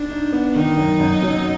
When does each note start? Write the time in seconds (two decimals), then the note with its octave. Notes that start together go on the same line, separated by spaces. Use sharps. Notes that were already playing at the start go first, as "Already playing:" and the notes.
Already playing: D4
0.10 D#4
0.32 B3
0.55 D#3 D#4
0.77 F#2
1.00 F#2
1.22 F#3